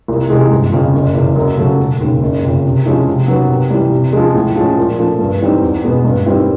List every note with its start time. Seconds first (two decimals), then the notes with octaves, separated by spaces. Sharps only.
0.08 C2
0.30 C3 E3 G#3
0.51 G1
0.72 F2 C#3
0.94 F#1
1.15 E2 C#3
1.36 F#2
1.57 C#3 F#3 A3
1.79 E1
2.00 D#2 C#3
2.21 F#1
2.44 F2 C#3
2.65 C3
2.86 F3 G#3 C#4 E4
3.07 C3
3.28 D#3 F#3 B3
3.49 C3
3.70 E3 G3
3.92 C3
4.13 F3 G#3
4.34 A2
4.56 F3 G#3 C#4
4.77 A#2
4.98 F3 A3
5.19 G2
5.41 E3 G3 C4 D#4
5.62 E2
5.84 B2 G#3 B3
6.04 G2
6.26 D#3 G3 C4 E4